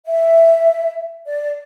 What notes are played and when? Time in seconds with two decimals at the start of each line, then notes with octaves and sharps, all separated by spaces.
0.05 E5
1.27 D5